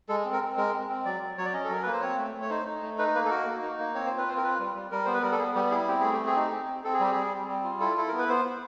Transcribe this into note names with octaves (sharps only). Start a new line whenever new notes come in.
G#3 A4
C4
A#4
C4
G#3 A#4
C4
C4
F#3 D5
F#3
F#3 C#5
D5
C#4 D#5
A4
F#3 A#4
A#3 B4
C5
C4 C#5
A3
A3
C#5
D#4 C5
D#4
A3
D#4 B4
A#3 B4
A4
F#4 A#4
A#3
D#4
A#3
C4 C#5
F4 C5
B4
C4 C5
A#4
F4 B4
G3
G3
G3 A#4
B3 C5
B4
G3 A#4
A4
B3 G#4
G3 G4
E4 G#4
C4 G4
A3 G#4
G4
C4
G#4
D#4 G4
C4
C4
C4 A4
G#4
G3 G4
G3 G#4
C4
G3
F4
E4 A4
E4 A4
B3 A#4
B4
B3 C5
B3